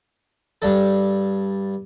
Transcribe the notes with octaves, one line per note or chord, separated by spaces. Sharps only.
G2 D4 A4